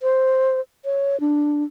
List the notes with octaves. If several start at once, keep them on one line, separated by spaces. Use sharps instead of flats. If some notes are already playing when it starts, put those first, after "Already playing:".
C5
C#5
D4